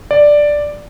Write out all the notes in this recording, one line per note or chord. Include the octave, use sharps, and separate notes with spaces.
D5